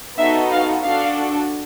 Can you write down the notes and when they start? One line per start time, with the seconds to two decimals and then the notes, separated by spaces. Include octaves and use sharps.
0.18 B3 D#4 F#4 A4 E5
0.51 F5
0.84 D4 F#4 A4 F5